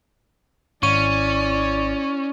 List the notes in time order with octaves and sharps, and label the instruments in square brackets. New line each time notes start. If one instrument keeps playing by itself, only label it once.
[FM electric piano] G#1 [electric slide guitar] C#4 [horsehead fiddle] E4 D5 [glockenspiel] C#6 D#7